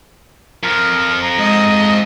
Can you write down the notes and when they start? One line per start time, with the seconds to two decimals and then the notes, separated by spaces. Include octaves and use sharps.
0.64 F2 F3 A#4
1.22 A#5
1.39 G#2 D#5